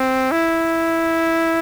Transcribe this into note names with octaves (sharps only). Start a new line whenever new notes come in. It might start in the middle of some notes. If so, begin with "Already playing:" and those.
Already playing: C4
E4